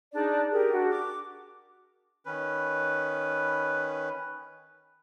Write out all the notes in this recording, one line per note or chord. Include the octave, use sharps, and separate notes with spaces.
D4 D#4 G#4 D5
G4 G#4 A#4
D4 F#4
D6
D#3 C#4 B4